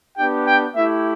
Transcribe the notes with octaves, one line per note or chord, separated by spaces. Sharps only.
B3 D4 G4 G5
G5
A3 E4 G4 E5